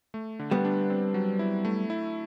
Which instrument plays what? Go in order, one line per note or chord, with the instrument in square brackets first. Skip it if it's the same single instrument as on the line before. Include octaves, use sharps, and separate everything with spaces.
[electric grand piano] A3
D3
[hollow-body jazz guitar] G3 B3
[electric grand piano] D4
C4
F#3
E4
A3
E4